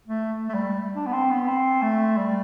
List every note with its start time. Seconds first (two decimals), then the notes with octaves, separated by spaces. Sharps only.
0.07 A3
0.49 A3
0.54 G3
0.95 D4
1.06 B3
1.12 C4
1.30 B3
1.48 C4
1.82 A3
2.17 G3